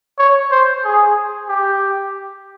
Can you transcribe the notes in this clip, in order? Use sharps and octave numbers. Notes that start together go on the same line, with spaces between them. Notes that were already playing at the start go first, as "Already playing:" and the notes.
C#5
C5
G#4
G4